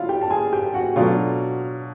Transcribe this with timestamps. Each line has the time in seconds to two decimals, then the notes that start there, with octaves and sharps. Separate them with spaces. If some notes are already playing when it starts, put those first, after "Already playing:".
Already playing: F#3 E4 F4 F5
0.09 G4 G5
0.21 A5
0.30 G#4 G#5
0.53 G4 G5
0.74 F#4 F#5
0.96 B2 F#3 A3 D4 F4 F5